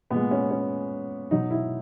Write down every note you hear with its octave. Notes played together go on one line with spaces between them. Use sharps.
A#2 G#3 B3
C#4
C#4
B2 F#3 D#4
E4